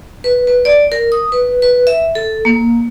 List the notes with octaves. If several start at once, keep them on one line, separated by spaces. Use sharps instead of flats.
B4
B4
D5
A#4
D#6
B4
B4
E5
A4
A#3